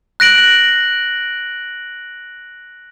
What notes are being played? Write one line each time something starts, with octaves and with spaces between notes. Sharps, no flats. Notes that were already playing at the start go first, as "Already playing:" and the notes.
F#6 A#6 D7 F#7